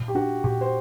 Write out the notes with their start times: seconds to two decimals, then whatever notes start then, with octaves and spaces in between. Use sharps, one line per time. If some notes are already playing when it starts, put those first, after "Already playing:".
Already playing: A#2
0.08 G4
0.15 D4 F#4
0.44 A#2 G4
0.61 C5